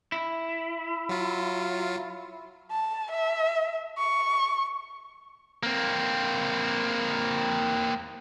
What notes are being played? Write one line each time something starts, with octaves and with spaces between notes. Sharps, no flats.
E4
F#3 F4
A5
E5
C#6
A#3 C4